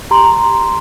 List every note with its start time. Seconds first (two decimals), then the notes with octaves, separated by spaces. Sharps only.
0.11 G4 A#5 C6